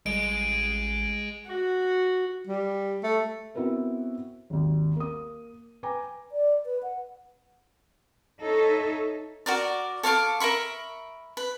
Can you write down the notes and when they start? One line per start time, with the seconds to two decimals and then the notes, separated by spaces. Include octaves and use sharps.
0.06 A1 G3 G#3 D7
1.47 F#4
2.47 G3
3.03 A3
3.55 B3 C4 E4 F#4 A#4 B4
4.50 G#1 D#2
4.96 A#3 D#6
5.83 B4 G5 G#5 A#5 D6
6.32 D5
6.66 B4
6.83 F#5
8.41 D#4 A4 C#5 E5
9.46 F#4 A#4 D5
10.03 A4 C#5 F5 D6
10.40 A#4 E5 B5 C#6
11.37 B4